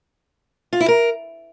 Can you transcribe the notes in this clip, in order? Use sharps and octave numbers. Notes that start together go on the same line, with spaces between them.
F4
E4
A#4